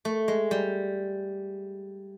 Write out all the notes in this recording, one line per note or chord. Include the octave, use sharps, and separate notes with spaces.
A3
G#3
G3